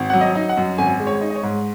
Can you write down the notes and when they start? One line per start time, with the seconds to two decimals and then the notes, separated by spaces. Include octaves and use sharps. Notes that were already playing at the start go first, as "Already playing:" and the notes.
Already playing: G#1
0.10 F#3 F#5
0.21 D#5
0.35 D#4
0.49 F#5
0.57 F#2
0.78 G#1 G#5
1.00 G#3
1.07 C#5
1.21 D#4
1.30 D#5
1.36 C#5
1.43 G#2